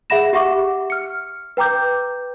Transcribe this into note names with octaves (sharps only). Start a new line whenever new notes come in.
G#4 E5 F#5 B5 A#6 E7
G4 E5 F#5 C#6 D6
F6 C#7
B4 G5 A#5 D6 G6